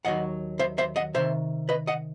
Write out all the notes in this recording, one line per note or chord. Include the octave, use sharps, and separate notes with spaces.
D#2 D#3 F#3 D#5 F#5
C5 E5
C5 E5
D#5 F#5
C2 C3 D#3 C5 E5
B4 D#5
D#5 F#5